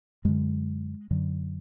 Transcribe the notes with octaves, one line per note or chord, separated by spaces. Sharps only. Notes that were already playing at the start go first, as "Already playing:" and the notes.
F#2 D3 G#3
F#2 D3 F#3